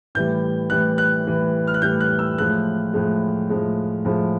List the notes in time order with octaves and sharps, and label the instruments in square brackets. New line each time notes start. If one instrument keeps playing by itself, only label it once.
[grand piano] A2 E3 G3 G6
A2 E3 G3 F#6
F#6
A2 E3 G3
F6
F#6
A2 E3 G3 G6
F#6
E6
A2 F3 G#3 F#6
A2 F3 G#3
A2 F3 G#3
A2 F3 G#3